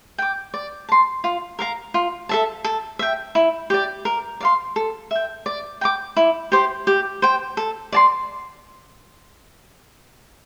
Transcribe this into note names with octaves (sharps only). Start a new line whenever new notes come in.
G5 D6
D5
A5 C6
F4
A#4 F5 A#5
F4
A4 E5 A5
A4
E5 G5
E4
G4 D5
A#4
D5 F5 C6
A4
E5 G5
D5
G5 A#5 D6
E4
G4 C5
G4
C5 G5
A4
D5 A5 C6